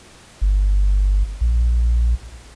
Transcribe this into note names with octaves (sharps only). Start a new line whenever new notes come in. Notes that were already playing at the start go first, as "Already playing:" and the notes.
G1
A#1